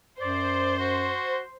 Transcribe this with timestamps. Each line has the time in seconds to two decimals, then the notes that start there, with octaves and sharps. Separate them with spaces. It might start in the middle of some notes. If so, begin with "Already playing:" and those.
0.21 F#2 C5 D5
0.80 F#4